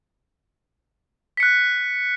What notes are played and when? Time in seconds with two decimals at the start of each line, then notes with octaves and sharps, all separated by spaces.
1.37 B6
1.40 C#7
1.43 F#6